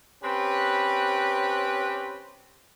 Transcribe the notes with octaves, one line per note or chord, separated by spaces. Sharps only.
C4 C#4 G4 B4